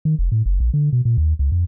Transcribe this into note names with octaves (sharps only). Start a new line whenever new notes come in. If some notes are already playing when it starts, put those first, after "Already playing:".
D#3
F1
A2
F#1
A#1
D3
B2
A#2
D#2
C#2
F2